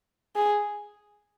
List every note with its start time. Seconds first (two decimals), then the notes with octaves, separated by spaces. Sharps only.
0.36 G#4